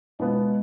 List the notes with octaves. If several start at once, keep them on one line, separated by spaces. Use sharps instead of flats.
B2 G#3 B3 F4